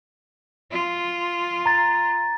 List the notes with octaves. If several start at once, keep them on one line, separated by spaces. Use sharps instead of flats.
F4
A#5 A6